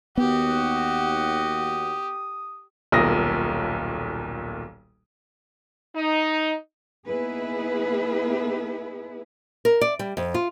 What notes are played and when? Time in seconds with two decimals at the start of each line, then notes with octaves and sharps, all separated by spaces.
0.17 D#2 B3 F#4 G4 D#6
2.92 D#1 B1 A#2 D#6 A#6
5.95 D#4
7.07 A#3 B3 D#4 E4 G#4 B4
9.65 A#4
9.81 D5
9.99 G3
10.17 F2
10.34 F4